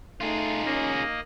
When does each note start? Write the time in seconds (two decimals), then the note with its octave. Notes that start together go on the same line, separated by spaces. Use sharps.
0.21 A3 D#4 F4 G#4
0.65 A#3 C#4 D#5